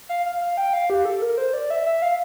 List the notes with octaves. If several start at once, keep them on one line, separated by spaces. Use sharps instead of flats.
F5
F5
F5
G5
F5
G4
A4
A#4
C5
D5
E5
E5
F5